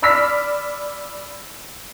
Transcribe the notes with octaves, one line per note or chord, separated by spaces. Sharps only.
D5 B5 E6 F6 B6